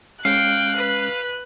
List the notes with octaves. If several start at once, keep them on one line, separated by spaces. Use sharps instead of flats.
G#3 C#4 F5 G5 F#6
B4